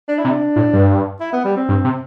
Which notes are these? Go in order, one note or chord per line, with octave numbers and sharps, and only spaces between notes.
D4
E4
C3
D4
A2
G2
E4
B3
G3
C4
G2
C3